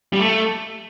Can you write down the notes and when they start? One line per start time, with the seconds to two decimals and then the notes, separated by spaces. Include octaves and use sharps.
0.13 G3
0.19 A3